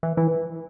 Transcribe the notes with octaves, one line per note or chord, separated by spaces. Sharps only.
E3
E3